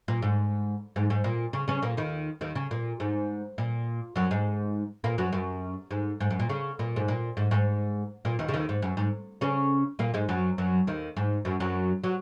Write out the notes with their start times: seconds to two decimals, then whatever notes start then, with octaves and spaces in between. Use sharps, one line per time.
0.08 A#2
0.22 G#2
0.96 G#2
1.10 G#2
1.24 A#2
1.53 C#3
1.68 C#3 C#4
1.82 A#2 A#3
1.97 D#2 D#3
2.41 D#2 D#3
2.55 C#3
2.71 A#2
3.00 G#2
3.58 A#2
4.16 F#2 F#3
4.31 G#2 G#3
5.04 A#2 A#3
5.18 F#2 F#3
5.33 F#2
5.91 G#2
6.20 G#2
6.30 F#2
6.39 A#2
6.49 C#3
6.79 A#2
6.96 G#2
7.08 A#2
7.37 G#2
7.51 G#2
8.25 A#2
8.39 D#2 D#3
8.48 C#3
8.54 D#2 D#3
8.69 G#2
8.82 F#2
8.97 G#2
9.41 C#3 C#4
9.99 A#2 A#3
10.14 G#2 G#3
10.29 F#2 F#3
10.58 F#2 F#3
10.87 D#2 D#3
11.17 G#2
11.45 F#2
11.60 F#2 F#3
12.04 F#3